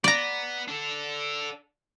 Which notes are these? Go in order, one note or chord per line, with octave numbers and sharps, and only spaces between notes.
B3 D5 A#5
D4 A4